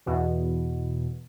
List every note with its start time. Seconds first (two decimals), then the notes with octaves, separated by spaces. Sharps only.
0.06 E2 B2